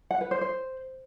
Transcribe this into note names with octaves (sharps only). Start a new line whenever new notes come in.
F#5
B4
C5
C5